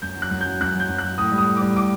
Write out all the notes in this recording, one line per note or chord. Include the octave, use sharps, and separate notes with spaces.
F#2 G6
F#3
F#6
F#2
G6
F#3
F#2 F#6
F#3 G6
F#2
F#6
F#3
A2 D#6
G3
D#6
A2
D6
G3
A2 D6